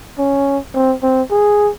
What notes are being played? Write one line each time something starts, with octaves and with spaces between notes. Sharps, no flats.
C#4
C4
C4
G#4